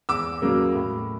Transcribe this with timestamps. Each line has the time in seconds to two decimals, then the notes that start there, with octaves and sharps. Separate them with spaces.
0.09 E2 D6 E6
0.42 C#3 F#3 A#3
0.75 A2